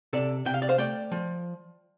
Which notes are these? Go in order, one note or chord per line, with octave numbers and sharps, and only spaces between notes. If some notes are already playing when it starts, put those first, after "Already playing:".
C3 A4 D5
C3 G5
F5
D5
C5 F5
A3 D5 G5
F3